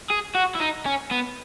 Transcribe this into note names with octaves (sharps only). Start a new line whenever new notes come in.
G#4
F#4
E4
D#4
C#4
B3